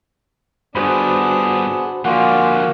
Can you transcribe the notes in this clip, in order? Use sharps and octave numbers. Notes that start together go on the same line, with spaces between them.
G2 B3 D4 F#4 G#4 C5 F#5 B5
D3 F3 A#3 F#4 D5 F#5 G#5 C6